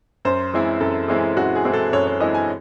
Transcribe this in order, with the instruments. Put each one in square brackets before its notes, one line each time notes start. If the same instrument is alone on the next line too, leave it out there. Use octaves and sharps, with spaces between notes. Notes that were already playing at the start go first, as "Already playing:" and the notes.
[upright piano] F#2 C5
E3 G#3 C4 E4
F#2 A4
E3 G#3 C4 E4
F#2 F#4
G#4
E3 G#3 C4 E4
A4
F#2 C#5
C#5
E3 G#3 C4 E4 D#5
G#5